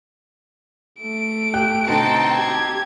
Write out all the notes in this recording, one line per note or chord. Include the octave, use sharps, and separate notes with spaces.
A3 D7
G4 G5 F#6
B2 D3 C4 D#4 G5 A5
G4 G#6